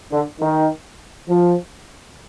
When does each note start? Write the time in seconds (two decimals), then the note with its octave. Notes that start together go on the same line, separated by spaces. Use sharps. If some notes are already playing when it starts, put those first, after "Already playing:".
0.11 D3
0.40 D#3
1.28 F3